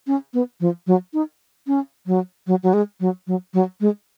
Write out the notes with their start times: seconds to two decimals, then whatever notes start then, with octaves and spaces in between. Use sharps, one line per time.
0.07 C#4
0.34 B3
0.60 F3
0.87 F#3
1.14 D#4
1.67 C#4
2.07 F#3
2.47 F#3
2.63 F#3
2.74 G#3
3.00 F#3
3.27 F#3
3.54 F#3
3.81 G#3